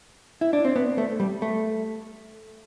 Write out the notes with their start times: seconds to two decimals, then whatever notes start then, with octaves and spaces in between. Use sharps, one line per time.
0.41 E4
0.53 D4
0.65 C4
0.76 B3
0.98 A3
1.20 G3
1.42 A3